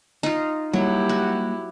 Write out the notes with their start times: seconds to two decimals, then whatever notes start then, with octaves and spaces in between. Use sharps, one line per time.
0.23 D#4 F4
0.73 F#3 G3 A#3 E4 G4
1.09 F#4